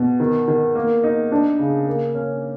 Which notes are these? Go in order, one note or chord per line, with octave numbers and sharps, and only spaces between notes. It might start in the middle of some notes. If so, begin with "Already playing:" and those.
Already playing: B2
D#3
D#3
A#3
D#4
D4
C#3
A#3
C#4